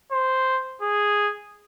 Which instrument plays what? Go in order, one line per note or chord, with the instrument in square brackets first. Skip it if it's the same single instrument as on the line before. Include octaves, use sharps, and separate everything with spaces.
[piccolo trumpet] C5
G#4